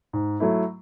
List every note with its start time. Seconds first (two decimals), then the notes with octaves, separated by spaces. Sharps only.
0.13 G#2
0.40 F#3 A3 E4